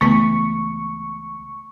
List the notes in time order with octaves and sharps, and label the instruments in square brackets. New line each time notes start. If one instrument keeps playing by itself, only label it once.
[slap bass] C#2 E3 [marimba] A3 B3 [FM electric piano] C#6